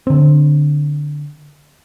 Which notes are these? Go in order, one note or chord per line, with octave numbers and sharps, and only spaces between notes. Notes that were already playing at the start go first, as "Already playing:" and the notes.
D3 C4